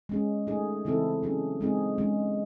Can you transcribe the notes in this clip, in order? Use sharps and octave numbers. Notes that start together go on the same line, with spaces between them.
G#3 C#4 G#4
A3 D#4 G#4
C#3 E3 C4 E4 A4
F#3 C#4 G#4
G#3 C4 D#4 G#4
G#3 C#4 G#4